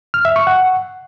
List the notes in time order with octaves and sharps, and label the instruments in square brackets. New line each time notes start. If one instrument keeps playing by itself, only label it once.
[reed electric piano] F6
E5
C#6
F#5